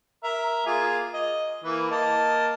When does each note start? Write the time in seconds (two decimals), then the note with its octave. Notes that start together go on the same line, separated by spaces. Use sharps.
0.24 A#4 E5
0.66 A#3 F4 G#4
1.13 D#5
1.64 E3 A#3 B4
1.91 A#3 D#5 A5